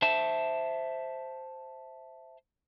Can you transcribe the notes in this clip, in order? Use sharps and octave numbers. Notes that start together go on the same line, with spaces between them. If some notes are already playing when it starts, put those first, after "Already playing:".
C5 E5 A5